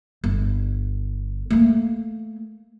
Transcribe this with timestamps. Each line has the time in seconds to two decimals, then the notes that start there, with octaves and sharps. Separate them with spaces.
0.24 G1
1.50 A3 A#3